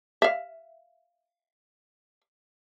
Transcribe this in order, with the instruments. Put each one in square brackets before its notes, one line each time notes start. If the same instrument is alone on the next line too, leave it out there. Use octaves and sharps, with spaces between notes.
[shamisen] E5 F5